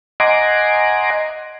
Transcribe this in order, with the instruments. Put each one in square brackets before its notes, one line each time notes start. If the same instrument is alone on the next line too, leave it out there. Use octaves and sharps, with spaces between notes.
[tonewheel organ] D#5 F#5 G#5 A#5 C6 D6